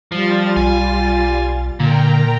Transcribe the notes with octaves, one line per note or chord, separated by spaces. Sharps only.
F3 G3 F4 A6
B1 G#5
A#2 D3 A#4 G5 A#5